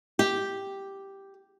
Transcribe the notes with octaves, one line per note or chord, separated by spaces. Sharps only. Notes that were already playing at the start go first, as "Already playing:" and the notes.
G4